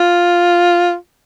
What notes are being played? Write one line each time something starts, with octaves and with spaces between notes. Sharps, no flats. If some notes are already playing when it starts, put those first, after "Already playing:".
Already playing: F4